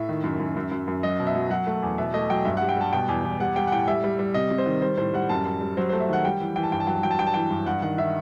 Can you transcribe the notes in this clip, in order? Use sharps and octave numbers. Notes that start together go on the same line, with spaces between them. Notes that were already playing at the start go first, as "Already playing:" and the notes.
Already playing: A2 E5
D#3
F#2
F#2
F#2
F#2
F#2
F#3 D#5
B2
E5
F#3
F#3 F#5
A3
E2
B2 E5
A3 D#5
F#3 G5
G2 E5
G3 F#5
G5
G3 A5
B2 G5
E2
E2
G3 F#5
G3 G5
F#5
A2 G5
G3 E5
G3
G3
C3 D#5
C3
C5
D#3
G3 C5
A2 C5
G3 F#5
F#2 A5
F#2
G3
F#3 C5
A3 C5
E5
D#3 F#5
G3 G5
E3
E3 G5
A5
G2 G5
A5
F#3 G5
A5
F#3 G5
A5
G2 G5
A5
E3 G5
G2
G2 F#5
D#3 F#5
D#3 E5